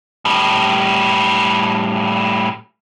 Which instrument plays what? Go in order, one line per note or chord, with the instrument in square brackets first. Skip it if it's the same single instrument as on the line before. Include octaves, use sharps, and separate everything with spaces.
[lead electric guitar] A2 G3